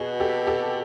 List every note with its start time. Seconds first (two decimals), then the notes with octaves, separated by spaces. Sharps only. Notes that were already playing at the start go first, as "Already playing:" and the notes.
Already playing: B2 F#4 G#4
0.20 G4 A4
0.47 G4 A4